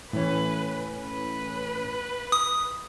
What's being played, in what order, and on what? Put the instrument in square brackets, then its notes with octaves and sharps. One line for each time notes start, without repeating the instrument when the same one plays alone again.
[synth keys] A2 E3 C#4 [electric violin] B4
[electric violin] B4
[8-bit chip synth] D#6